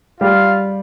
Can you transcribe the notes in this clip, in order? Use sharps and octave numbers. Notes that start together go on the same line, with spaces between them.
G3 F4 F5